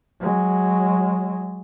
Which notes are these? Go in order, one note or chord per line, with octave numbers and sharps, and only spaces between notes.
F#3 G#3